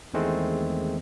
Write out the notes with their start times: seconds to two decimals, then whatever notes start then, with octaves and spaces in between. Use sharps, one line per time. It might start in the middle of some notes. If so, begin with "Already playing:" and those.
0.14 E2 D#3 G#3 A3 C4